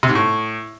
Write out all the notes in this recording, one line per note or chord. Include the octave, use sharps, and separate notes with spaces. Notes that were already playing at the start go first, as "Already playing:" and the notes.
C3
G#2
A2